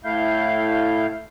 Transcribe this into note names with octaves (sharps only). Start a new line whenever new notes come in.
A2 A3 E4 F5 G6